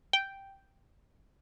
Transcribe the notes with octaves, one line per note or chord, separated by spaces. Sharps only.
G5